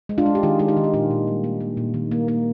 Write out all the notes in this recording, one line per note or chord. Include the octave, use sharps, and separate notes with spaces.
G#3
D4 F4
G#3
G4
D#3 F4 G#4
G#3 F4
D#4 G4
D#3
G4
A#2 D4 F4
A#2
G3
A#3
A#3
A#2
D#3
A#3
A#3